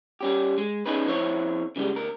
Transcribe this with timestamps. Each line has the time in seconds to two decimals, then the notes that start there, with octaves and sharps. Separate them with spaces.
0.21 G3 C#4 G4
0.58 G#3
0.86 C#4 D#4 G#4 B4
1.06 F2 E4 C5 C#5
1.76 C#3 E3 G3 G#3
1.95 D2 A#4